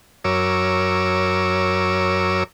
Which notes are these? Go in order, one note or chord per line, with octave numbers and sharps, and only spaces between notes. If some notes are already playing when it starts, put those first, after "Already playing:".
F#2 A#4 C#5 D6 E6